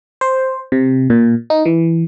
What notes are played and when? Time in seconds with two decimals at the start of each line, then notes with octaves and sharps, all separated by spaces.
0.21 C5
0.72 C3
1.10 A#2
1.50 D#4
1.65 E3